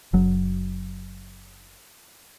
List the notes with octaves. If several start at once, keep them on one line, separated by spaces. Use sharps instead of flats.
F#1 F#3